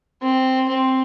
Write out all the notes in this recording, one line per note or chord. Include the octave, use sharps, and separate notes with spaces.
C4
C4